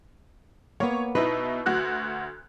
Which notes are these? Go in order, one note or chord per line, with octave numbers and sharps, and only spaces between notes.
A#3 B3 C#5
B2 D#4 E4 B4
D2 F#4 F#6